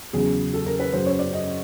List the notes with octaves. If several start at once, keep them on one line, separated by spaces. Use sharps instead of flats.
E2 C#3 F#3 G#4
A4
A#4
B4
F#2 C#3 F#3 C5
C#5
D5
D#5